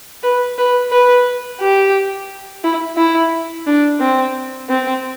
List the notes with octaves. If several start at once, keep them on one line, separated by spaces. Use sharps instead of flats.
B4
B4
B4
G4
E4
E4
D4
C4
C4